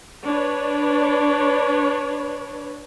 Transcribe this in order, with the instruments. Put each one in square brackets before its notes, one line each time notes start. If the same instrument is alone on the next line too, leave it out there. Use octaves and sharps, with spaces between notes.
[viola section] D4 B4 C#5